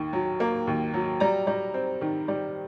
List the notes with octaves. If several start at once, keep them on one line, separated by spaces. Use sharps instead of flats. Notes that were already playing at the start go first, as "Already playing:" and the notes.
Already playing: D#2 D#3
F#3
A#3
D#2
F#3
G3 A#5
G3
C4
D#3
G3